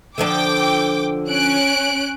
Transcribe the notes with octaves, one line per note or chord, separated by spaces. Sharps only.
D3 F3 D4 G5 D6
C#4 F#6 D7